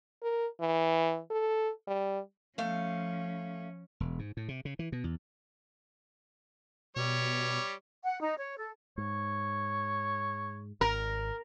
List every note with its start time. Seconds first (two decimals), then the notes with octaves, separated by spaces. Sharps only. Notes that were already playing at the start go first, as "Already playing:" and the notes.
0.23 A#4
0.60 E3
1.30 A4
1.88 G3
2.58 F3 A3 C#4 F5
4.00 E1
4.19 G#2
4.37 A2
4.48 C3
4.65 C#3
4.79 E3
4.92 B2
5.04 E2
6.96 B2 G3 C#5
8.04 F#5
8.20 D#4
8.38 C#5
8.57 A4
8.98 G#2 C#5
10.81 G#1 A#4